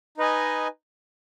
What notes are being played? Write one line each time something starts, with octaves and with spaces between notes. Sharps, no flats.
D#4 B4 D#5 G#5